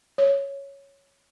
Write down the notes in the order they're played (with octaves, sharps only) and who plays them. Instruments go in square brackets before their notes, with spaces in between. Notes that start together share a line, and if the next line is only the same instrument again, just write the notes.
[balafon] C#5